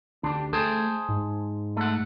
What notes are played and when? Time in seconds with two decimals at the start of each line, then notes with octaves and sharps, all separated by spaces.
0.23 D2 D4 G4
0.53 A3 G#4 C5 A5
1.09 G#2
1.77 A3 F#5